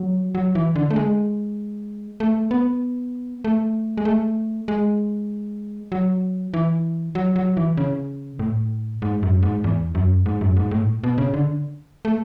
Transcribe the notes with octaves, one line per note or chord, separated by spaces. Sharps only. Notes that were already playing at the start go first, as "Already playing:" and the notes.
Already playing: F#3
F#3
E3
D3
A3
G#3
A3
B3
A3
G#3
A3
G#3
F#3
E3
F#3
F#3
E3
C#3
A2
G#2
F#2
G#2
E2
F#2
G#2
F#2
G#2
A2
B2
C#3
D3
A3